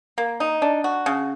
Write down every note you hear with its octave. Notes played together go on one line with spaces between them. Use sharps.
A#3
D#4
D4
F#4
C#3